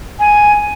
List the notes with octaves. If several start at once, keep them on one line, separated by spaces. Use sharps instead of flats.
G#5